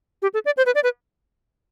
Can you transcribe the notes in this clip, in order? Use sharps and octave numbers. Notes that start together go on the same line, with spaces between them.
G4
A4
D5
C5
B4
D5
B4